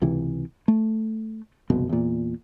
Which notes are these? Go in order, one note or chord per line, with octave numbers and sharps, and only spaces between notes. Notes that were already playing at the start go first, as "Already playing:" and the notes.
C#2 C3 E3
A3
F#1 C2 F2 B2
E2 A#2